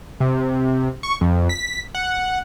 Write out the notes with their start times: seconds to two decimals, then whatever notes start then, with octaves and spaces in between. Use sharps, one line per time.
0.20 C3
1.03 C#6
1.21 F2
1.49 B6
1.95 F#5